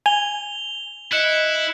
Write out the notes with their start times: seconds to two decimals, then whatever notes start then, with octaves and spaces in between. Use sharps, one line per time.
0.06 G#5 F7 G7
1.13 E4 D#5 F#6 C#7 E7